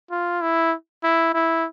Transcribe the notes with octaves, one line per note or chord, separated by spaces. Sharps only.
F4
E4
E4
E4